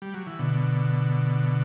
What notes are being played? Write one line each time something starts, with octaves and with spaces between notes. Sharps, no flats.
G3
F#3
E3
B2 D3